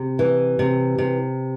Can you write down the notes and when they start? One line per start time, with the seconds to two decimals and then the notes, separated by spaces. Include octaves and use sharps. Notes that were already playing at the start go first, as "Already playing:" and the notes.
Already playing: C3
0.19 E3
0.59 C3
0.98 C3